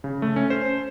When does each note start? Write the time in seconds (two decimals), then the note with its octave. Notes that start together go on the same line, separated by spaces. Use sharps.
0.04 C#3
0.22 A3
0.36 C#4
0.50 C5